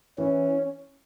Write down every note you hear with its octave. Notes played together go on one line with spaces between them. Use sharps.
E3 C#4